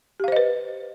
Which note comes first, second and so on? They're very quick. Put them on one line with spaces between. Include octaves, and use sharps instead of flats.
G4 F5 C5 D#5 B4